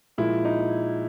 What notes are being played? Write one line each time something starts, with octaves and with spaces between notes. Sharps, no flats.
A#2 F3 G#3 E4
D#4